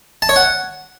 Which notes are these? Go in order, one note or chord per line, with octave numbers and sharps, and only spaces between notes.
A5
C#5
F#5